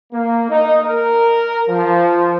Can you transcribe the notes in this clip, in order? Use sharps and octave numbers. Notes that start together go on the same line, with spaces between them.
A#3
D#4
A#4
F3